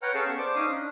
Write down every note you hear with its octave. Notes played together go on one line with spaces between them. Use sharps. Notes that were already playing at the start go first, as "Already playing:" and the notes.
B4 C#5 F#5 G5 A#5 F6
C#4 G#4 A4 F5 G5 A5
B3 A5 C#6
C5 D5 A5 D6
C#4 D#4 F5 D#6
D4